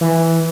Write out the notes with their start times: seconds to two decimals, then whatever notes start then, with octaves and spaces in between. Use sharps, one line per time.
0.01 E3